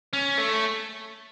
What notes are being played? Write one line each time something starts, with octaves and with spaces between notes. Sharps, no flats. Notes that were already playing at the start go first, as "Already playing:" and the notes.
C#4
A3